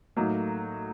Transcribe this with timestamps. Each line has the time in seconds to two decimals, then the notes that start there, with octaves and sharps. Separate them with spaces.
0.16 A2 F#3 A3 A#3 D#4